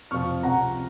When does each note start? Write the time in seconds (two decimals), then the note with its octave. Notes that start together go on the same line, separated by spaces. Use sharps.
0.11 F2 C3 F3 C#6 F6
0.43 C#2 C3 F3 F#5 A#5